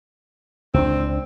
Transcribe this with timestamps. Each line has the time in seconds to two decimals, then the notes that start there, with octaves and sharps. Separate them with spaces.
0.74 C#2 C4 D4